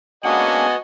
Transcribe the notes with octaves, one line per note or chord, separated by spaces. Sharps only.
A#3 C#4 D4 F#4 B4 D#5 F#5 G#5